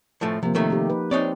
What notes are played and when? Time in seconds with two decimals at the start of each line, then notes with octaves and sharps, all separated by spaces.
0.21 A2 F3 A3
0.43 C3 F3 A#3
0.55 C3 D#3 A3
0.70 D#4 G4
0.90 B4
1.11 C4 D#4 C#5 D5